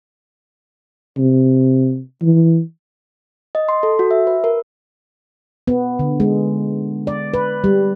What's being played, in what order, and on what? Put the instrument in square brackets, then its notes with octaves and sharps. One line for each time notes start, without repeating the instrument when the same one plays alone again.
[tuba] C3
E3
[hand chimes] D#5
C6
A4
F#4
E5
B4
A#4
[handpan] B3
D3
G#3
D5
B4
G3